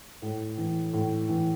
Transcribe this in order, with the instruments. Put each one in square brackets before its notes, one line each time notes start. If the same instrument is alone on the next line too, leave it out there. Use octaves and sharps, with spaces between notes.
[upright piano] A2
E3
A2
E3